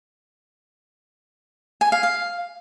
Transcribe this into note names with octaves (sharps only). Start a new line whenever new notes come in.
G#5
F5
F5